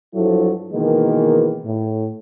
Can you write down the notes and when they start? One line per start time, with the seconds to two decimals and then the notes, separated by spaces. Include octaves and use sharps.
0.14 G2 F3 F#3 E4 A4
0.73 B2 D#3 E3 G#3 A#3
1.65 A2